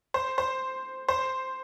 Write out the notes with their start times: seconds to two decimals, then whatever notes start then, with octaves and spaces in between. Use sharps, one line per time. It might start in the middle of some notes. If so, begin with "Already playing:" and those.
0.14 C5
0.38 C5
1.09 C5